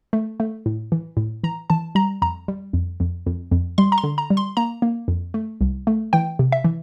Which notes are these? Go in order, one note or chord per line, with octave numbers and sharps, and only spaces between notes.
A3
A3
A2
E3
A2
E3 A#5
E3 A5
G3 A#5
F2 A#5
G3
F2
F2
F2
F2
G3 C6
A#5
C6
D3
A#5
G3
C6
A#3 A#5
A#3
F2
A3
C2
A3
E3 G5
C3
E5
E3